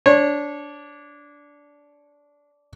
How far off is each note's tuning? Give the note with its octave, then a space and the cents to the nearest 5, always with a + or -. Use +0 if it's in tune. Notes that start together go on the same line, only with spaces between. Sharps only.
D4 -15 C#5 -25